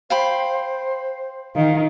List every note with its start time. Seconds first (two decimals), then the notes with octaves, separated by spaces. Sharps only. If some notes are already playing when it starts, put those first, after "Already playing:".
0.10 C5 F5 G5 B5
1.55 D#3 F5